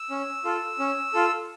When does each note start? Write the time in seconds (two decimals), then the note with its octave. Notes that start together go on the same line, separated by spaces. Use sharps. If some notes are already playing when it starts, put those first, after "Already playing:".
Already playing: E6
0.10 C#4
0.44 F4 A4
0.79 C#4
1.14 F4 A4